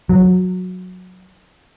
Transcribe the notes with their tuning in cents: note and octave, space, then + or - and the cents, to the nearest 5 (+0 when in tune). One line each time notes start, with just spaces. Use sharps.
F#3 -15